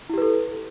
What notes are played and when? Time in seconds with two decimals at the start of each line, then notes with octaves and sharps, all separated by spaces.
0.09 E4
0.14 G4
0.18 B4
0.22 A4